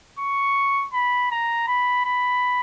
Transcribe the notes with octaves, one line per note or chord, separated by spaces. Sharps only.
C#6
B5
A#5
B5
B5